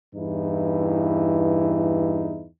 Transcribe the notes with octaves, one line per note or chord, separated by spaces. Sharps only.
E2 G2 E3 D#4 E4